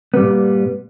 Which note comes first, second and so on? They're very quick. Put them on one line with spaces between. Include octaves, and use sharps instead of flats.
B3 G3 G2 A#2